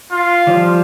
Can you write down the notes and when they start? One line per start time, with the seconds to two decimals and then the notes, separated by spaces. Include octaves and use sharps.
0.11 F4
0.47 F3 G3